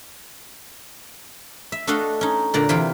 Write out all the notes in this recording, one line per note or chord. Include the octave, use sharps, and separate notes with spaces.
E5
A3 D4 F#4 A4 D#5 F5
C#4 D#4
A#2 D3 D5 A#5
C3 E3 F4 G5 C6